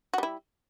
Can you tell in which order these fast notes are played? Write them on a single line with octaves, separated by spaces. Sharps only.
F#4 G3 E4